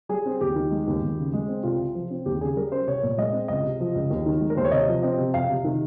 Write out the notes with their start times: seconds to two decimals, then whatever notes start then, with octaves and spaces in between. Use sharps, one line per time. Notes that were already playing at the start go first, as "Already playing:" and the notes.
0.09 G3 G#4
0.26 C4
0.41 D#2 G4
0.56 D#3
0.71 G#3
0.87 D#2
1.02 D#2
1.17 C#3
1.33 G#3
1.48 C4
1.63 C2 F4
1.79 C3
1.95 F3
2.10 C4
2.26 D#2 G4
2.40 C#3 G#4
2.56 G3 A#4
2.71 C#4 C5
2.87 C2 C#5
3.02 A#2
3.18 G#3 D#5
3.33 C4
3.48 C#2 D#5
3.64 C3
3.80 F3
3.95 C#2
4.10 D#2
4.26 D#3
4.41 G#3
4.50 A#4
4.56 D#2 C5
4.65 C#5
4.71 C3 D#5
4.88 F3
5.03 C4 D#5
5.18 C3
5.34 F2 F5
5.49 C3
5.64 D#3